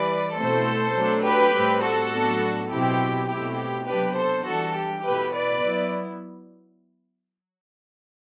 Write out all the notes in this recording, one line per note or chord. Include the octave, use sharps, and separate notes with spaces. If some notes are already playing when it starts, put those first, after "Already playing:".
Already playing: E3 G3 B4 D5
B2 A3 C4 E4 A4 C5
F#3 A3 D4
G4 B4
A2 G3 C4
F#4 A4
A2 F#3 B3 D4
B2 F#3 C4 E4 G4
B2 A3 C4 E4 G4
G4
C3 F#3 B3 D4 G4 B4
A4 C5
E3 G3 D4 F#4 A4
G4
B2 A3 E4 G4 B4
B4 D5
F#3 B3 E4